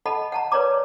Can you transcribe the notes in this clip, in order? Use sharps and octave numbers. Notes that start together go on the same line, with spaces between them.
A4 D#5 F#5 A5 B5
F#5 A5 A#5
A#4 B4 C#5 D5 A#5 D6